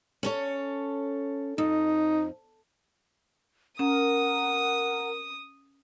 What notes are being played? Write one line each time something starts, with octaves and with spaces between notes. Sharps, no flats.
C#4 A4 C#5
F2 D#4
C#4 A#4 F#5 D#6